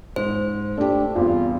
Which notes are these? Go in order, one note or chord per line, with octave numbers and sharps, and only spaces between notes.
G#2 C5
A3 D4 G4
E2 G2 C4 F4